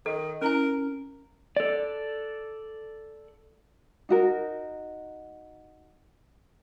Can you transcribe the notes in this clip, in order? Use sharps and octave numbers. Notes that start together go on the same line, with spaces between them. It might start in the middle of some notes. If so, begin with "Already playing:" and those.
D#3 A4
C#4 E4 A#4 G#5
A4 D5
D#4 F#4 A#4